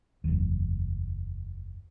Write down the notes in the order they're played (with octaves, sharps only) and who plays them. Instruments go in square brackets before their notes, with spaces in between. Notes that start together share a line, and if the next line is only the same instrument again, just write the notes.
[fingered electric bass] F#1 E2